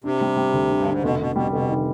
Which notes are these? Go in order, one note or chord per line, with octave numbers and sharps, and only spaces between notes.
C3 D4
G3
G3
D2
D3
G2
G#2 D3
F1 B2
F1 B2
B2 G3
F1 B2
D#3